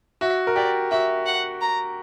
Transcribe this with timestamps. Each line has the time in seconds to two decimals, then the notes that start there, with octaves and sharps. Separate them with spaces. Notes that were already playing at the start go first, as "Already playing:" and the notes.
0.21 F#4 E5
0.47 A#4
0.56 G4 D5
0.91 F#4 E5
1.26 F#5
1.61 A#5